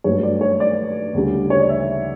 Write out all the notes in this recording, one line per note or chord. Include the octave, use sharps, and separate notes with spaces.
G2 F#3 A3 C#5
D5
C#5
D5
D2 C#3 G3
C#5
D5
E5